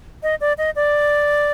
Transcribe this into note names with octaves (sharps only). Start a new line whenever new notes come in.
D#5
D5
D#5
D5